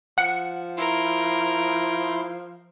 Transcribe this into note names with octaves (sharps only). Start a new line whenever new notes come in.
F3 F#5 C#7
E4 A#4 C6